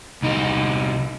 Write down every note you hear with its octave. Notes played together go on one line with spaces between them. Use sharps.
C2 D#4